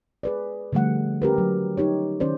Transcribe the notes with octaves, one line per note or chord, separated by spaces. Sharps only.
G#4 B4 D5
D3 F3 G3 A3 F#5
C#4 G4 A#4 B4
F#3
D#4 G4 C#5
D#3 C#4 C5 D5